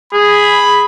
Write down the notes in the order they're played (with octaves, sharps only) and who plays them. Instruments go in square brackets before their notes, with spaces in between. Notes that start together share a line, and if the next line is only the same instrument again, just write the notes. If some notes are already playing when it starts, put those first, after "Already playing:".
[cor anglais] G#4 [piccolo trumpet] B5